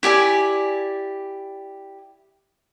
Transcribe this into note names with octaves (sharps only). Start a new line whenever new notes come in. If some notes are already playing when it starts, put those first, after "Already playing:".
E4 G4 D5 G#5